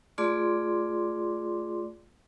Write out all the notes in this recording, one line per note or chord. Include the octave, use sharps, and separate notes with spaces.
A3 F4 G#4 D5 C6 D6